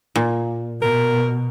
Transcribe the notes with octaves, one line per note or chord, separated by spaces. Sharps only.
A#2
B2 A#4